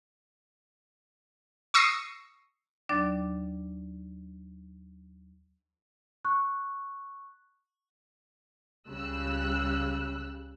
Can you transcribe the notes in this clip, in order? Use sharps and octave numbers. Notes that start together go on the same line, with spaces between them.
C#6 D#6 E6 A#6 C7 C#7
D#2 F#3 D4 D5 D6 A6
C#6 F#6
C#2 C#3 G3 E6 F#6